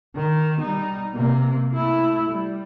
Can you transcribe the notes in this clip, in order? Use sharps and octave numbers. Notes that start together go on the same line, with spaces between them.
D#3
G3 D#4
C3 A#3
A3 E4
G3